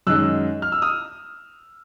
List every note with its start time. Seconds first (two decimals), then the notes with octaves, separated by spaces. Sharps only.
0.07 F#2 D#3 G#3 E6 F#6
0.62 F6
0.72 E6
0.82 D#6 F6